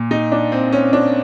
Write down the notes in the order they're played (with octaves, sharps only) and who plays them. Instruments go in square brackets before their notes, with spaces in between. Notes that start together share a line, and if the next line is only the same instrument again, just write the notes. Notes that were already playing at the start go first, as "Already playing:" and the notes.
Already playing: [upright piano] A#2
[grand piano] D#4
D4
C4
C#4
D4